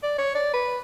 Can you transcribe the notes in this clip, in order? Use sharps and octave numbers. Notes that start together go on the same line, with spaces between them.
D5
C#5
D5
B4